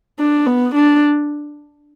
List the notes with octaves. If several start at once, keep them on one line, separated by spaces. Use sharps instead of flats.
D4
B3
D4